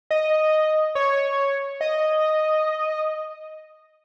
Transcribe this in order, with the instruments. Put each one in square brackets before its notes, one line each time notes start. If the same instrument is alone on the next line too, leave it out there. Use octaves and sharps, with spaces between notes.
[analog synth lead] D#5
C#5
D#5